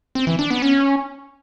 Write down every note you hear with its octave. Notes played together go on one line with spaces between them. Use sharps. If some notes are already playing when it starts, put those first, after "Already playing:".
C4
E3
D4
B3
C#4